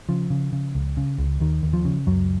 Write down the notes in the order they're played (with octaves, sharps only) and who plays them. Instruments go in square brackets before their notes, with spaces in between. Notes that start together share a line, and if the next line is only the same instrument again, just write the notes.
[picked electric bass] C#3 F3
C#3
C#3
C#2
C#3
C#2
D#2 D#3
D#2
F3
C#3
C#2 F#2 F#3